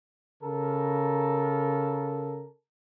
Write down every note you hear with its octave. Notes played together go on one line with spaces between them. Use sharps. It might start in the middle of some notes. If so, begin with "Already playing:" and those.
C#3 A4 A#4